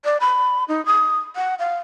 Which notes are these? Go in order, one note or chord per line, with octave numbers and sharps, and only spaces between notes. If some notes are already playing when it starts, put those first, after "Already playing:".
D5
B5
D#4
D#6
F#5
F5